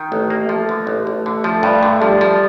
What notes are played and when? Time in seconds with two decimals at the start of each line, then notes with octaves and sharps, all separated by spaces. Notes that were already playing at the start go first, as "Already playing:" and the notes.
Already playing: D#3
0.12 A1 A3
0.30 A#3
0.49 F3 A3
0.69 D3
0.87 A1
1.07 A1
1.26 D3
1.44 F3
1.63 G2
1.83 D3
2.01 F3 G3
2.21 F3